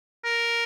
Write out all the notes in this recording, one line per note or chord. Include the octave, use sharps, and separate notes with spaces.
A#4